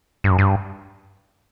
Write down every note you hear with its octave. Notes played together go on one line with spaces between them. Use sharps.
G2
F#2
G2